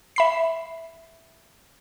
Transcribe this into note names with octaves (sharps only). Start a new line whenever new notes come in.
E5 B5 C7